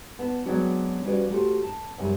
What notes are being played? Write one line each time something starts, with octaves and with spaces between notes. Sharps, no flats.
B3 D4 A5
F#3 G#3 B3 C4 D4 F#4
F3 G3 C#4 F#4 B4 D5
A3 F#4 G4 B4 C5
A5
F#2 C3 G3 G#5